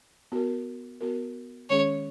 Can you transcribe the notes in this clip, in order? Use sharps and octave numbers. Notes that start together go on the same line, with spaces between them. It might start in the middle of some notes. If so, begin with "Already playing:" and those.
B3 F#4 A#4
B3 F#4 A#4
D#3 G#3 C#4 G#4 C#5